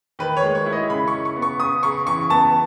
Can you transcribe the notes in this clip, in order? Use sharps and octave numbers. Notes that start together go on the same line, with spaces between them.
D#3 B4
C#5
G#3
C#5
E4
D#5
C#3 B5
C#6
C#3
C#6
B3
C#6
C#3 D#6
C#3 C#6
E3 C#6
B3 A5